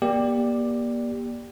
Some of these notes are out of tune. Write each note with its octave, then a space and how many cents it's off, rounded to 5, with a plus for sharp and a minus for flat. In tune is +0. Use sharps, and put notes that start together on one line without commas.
A#3 +35 G4 +10 D5 +0